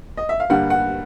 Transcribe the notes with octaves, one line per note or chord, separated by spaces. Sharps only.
D#5
E5
F5
G2 D3 G3 A#3 F#5
F#5